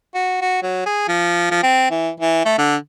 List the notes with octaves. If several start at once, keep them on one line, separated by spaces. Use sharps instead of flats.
F#4
F#4
F#3
G#4
F3
F3
C4
E3
E3
A3
D3